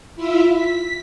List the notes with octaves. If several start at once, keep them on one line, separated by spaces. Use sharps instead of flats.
E4 F4 E5
B6